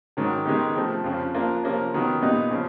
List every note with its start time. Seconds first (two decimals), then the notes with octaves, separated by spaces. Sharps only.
0.17 G#2 D#3 F#3
0.45 D#3 G#3 B3 D#4 G4
0.75 C3 F3 A3
1.04 F2 C#3 F3
1.34 F3 A#3 D4 F4
1.63 C3 F3 A#3 C#4
1.93 C3 D#3 F#3 B3
2.22 A#2 G3 B3 D#4
2.51 C#3 F3